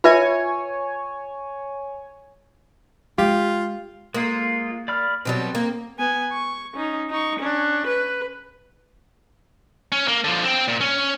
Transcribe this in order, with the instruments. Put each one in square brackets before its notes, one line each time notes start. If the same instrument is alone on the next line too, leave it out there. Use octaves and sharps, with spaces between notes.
[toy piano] F4 B4 E5 [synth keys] C#5 G#5
[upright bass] G#3 [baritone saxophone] F4 [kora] G4 [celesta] F5
[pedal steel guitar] G#3 F4 [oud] A#3
[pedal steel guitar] D5 B5 F6
[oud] B2 F#3 G3 [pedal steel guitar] C4
[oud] A#3
[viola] B3 G#5
C#6
C#4 D#4
D#4 C#6
C#4 D4
B4
[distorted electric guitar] C#4
A#3
D3 F3
C4 G5
A#2
C#4